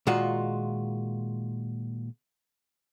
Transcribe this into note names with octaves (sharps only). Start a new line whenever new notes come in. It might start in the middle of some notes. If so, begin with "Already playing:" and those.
A#2 D#3 G#3 F4 F#4